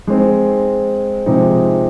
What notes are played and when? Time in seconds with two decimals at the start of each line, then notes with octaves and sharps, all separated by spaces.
0.07 G#3 C4 D#4
1.26 C3 F3 G#3 C4 D#4